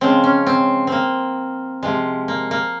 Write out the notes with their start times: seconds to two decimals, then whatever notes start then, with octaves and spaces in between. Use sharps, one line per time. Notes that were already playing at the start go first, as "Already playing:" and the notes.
0.01 C#3 F3 G#3 C4
0.24 C#4
0.47 C4
0.87 A#3 C4
1.83 C3 F3 G#3
2.28 A#3
2.51 A#3